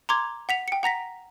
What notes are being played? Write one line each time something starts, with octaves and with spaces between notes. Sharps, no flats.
A#5 C6 D6 G#6
F#5 B6 F7
G5 C#7
F#5 A#5 A#6 B6